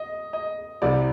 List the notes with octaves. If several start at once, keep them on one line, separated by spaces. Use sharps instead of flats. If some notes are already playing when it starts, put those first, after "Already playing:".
Already playing: D#5
D#5
C2 C3 G3 D5